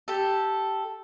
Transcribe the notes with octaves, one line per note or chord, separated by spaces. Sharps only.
G4 A4